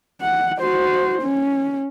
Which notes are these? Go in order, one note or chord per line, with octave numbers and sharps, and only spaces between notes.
F#5
F#4 C5
C#4